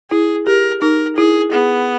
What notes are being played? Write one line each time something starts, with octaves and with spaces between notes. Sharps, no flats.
E4 G#4
G4 A#4
D#4 A#4
E4 G#4
B3 G#4